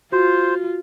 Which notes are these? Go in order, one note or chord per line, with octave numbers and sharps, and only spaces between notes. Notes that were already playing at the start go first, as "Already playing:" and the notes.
F4 F#4 C5